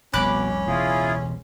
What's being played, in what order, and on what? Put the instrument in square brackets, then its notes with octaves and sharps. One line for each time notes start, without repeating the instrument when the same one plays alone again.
[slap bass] F1 C2 A3 [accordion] B2 [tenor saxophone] C#4 [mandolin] B5 D6 F#6
[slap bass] E1 C#2 [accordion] E4 F4 G#4